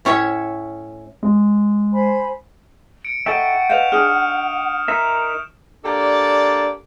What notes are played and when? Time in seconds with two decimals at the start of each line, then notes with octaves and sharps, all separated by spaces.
0.05 A2 C#4 C#5 E5
1.23 G#3
1.93 C5 G#5 B5
3.04 C#7 D7
3.26 D#4 A4 D#5 E5 F#5 G5 A5 C#6
3.70 B4 D#5 F5 G6 E7 F7
3.92 D4 D#4 G#4 D#6 F6
4.88 D#4 A#4 E5 E7
5.85 A#3 D4 G4 A4 D5 A5